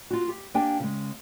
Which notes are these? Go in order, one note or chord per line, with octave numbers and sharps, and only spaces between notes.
F4 F#4
G4
A#3 D4 G4 G5 G#5
C#3 G#3